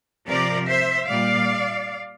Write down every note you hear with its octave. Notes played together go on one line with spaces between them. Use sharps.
C3 F3 A#4 D5
C5 E5
A#2 G3 D5 F5